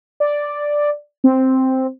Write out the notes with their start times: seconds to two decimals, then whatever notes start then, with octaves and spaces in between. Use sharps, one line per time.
0.20 D5
1.24 C4